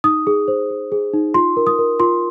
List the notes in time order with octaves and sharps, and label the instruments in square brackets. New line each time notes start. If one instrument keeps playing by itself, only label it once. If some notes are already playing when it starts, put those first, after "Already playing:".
[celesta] D#4 D#6
G#4
C5
G#4
G#4
D#4
F4 C6
A#4
D#6
A#4
F4 C6